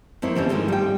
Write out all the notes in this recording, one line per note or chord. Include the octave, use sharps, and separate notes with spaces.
F2 A#3 C4 E4 C#5
D3 E3 G3 C4 C#4
G#2 D#3 F3 G#3 A3
G3 G5